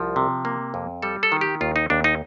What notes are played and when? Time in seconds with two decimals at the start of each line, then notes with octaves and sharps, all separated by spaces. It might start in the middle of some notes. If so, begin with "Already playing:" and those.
Already playing: C2 F3
0.16 C3
0.45 A#3
0.74 F2
1.02 G3 A4
1.23 A4
1.32 D#3
1.41 G4
1.61 D#2 F4
1.76 D#4
1.90 D#2 D4
2.04 D#4